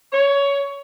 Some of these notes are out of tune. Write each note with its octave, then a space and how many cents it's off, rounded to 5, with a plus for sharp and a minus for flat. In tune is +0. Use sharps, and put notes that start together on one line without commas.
C#5 +15